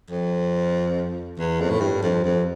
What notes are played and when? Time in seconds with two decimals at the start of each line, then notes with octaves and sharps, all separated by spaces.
0.10 F2
1.38 E2
1.60 F2
1.70 A2
1.81 G2
2.03 F2
2.24 F2